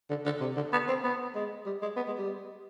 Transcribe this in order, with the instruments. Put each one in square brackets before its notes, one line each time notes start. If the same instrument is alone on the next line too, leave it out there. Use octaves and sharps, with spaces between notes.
[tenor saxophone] D3
D3
C3
D3
B3
C4
B3
G#3
G3
G#3
B3
G#3
G3